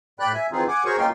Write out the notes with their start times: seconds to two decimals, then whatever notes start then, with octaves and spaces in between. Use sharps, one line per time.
0.20 A2 D5 G5 B5 F#6
0.33 E5 G#5
0.52 D#3 E3 C4 D#4 F4 G#4
0.68 F#5 G#5 D6
0.85 F#4 G#4 A#4 C5 C#5 C#6
0.98 A#3 C#4 D#4 F4 G5 C6